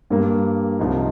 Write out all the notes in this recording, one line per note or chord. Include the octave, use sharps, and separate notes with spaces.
G2 G3 A#3
C2 C3 F3 D#4